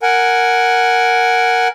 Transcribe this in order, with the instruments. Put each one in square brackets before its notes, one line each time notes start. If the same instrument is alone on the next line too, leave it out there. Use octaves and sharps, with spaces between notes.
[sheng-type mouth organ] A#4 F#5 G#5